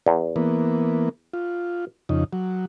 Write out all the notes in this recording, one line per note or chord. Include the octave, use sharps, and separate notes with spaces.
E2
E3 A#3 B3
F4
F2 C#3 D#4
F#3